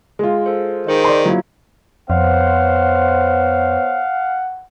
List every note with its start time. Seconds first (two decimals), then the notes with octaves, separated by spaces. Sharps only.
0.19 G#3 F4
0.46 A4 C5
0.87 D#3 G#4 C5 D#5
1.04 D5 C6
1.26 F#3 A#3 E4 F4
2.10 F2 B3 C5 C#5 F5 F#5